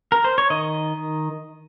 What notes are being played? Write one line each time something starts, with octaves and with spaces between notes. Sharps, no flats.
A#4
C5
C#5
D#3 D#5